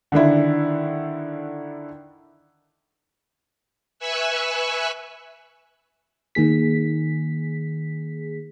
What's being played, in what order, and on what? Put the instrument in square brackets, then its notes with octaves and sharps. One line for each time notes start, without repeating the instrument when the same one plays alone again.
[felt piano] D3 D#3 D4 E4
[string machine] B4 E5 G#5 C#6 E6 F#6
[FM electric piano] D#3 A#3 G#4 B6